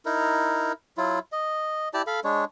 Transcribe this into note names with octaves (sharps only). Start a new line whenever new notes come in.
D#4 E4 A#4
F#3 E4 F4
D#5
E4 G4 D5 A5
A4 F5 B5
G#3 D4 C#5